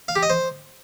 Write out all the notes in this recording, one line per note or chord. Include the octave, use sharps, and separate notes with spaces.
F5
G4
D#5
C5